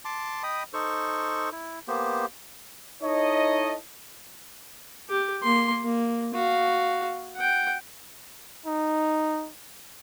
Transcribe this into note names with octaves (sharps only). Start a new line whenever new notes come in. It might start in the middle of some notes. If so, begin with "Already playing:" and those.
A5 C6 D6
D#5 G5 B5 D#6
D#4 A4 C5 C#6
E4
A#3 B3 G4 C5
D#4 E4 A4 C#5 D#5
G4
A#3 C6
A#3
F#4 F5
F#5 G5
D#4